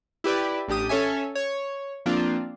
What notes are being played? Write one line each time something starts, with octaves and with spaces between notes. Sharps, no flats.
E4 G4 B4 D5
A1 D4 G4 D#6
C#4 A4 C#5 E5 G#5
C#5
F3 A#3 C4 D4 F4